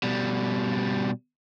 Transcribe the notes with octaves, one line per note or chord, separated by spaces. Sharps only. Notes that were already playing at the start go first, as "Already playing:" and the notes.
B2 G3